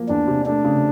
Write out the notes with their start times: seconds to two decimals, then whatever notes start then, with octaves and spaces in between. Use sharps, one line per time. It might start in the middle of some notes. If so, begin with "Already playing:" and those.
Already playing: F3 A#3
0.08 E2 D4
0.27 C3
0.46 A3 D4
0.65 C#3